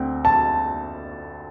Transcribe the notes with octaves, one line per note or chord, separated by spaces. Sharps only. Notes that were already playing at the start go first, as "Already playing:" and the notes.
Already playing: D2 C4
A5